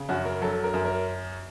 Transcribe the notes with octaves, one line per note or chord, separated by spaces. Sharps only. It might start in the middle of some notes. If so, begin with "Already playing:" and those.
Already playing: C#3
F#2 F#4
A#4
F#3 A4
A#4
F#2
A#4